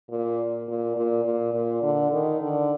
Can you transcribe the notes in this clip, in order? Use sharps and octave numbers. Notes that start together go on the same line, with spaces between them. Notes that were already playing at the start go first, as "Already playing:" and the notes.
A#2
A#2
A#2
A#2
A#2
D3
D#3
D3